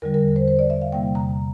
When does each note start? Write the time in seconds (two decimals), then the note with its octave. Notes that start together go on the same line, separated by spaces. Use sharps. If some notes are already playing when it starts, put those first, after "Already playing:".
0.02 E2 D3 G3 A#4
0.14 A#4
0.36 C5
0.48 C5
0.59 D5
0.70 E5
0.82 F5
0.92 E2 C3 G3 A#3 G5
1.15 A#5